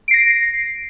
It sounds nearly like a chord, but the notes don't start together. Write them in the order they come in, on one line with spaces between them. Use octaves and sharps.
D7 C7 A#6